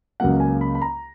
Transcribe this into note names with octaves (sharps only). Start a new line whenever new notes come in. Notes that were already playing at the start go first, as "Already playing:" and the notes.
C#2 C#3 F#3 A#3 F#5
G#5
B5
B5
A#5